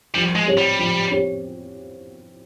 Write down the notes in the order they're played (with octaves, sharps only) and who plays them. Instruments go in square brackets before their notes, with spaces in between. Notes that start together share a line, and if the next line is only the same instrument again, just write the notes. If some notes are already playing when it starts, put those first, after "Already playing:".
[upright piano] F3 [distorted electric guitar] G3
[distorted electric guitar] G#3
[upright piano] C4 G4 C#5
[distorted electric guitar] G3
[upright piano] F3
C4 G4 C#5